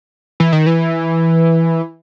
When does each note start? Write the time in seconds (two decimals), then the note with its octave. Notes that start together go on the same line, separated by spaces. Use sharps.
0.40 E3
0.53 D#3
0.66 E3